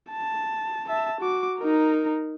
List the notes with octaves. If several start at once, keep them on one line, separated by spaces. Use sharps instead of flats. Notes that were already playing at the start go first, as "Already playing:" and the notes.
A5
E5 A5
F#4 D6
D#4 A#4